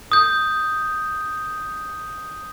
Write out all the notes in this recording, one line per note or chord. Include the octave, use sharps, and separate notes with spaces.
D#6 G6